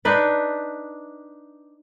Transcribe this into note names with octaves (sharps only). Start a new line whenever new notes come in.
D4 D#4 B4 D5